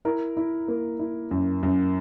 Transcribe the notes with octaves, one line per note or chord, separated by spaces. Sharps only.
E4 A#4
E4
A#3
E4
F#2
F#2